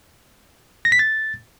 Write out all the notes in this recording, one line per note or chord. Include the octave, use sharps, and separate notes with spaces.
A#6
B6
A6